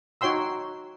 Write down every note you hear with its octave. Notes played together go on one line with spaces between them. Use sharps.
D#4 F#4 C#5 G5 C6 E6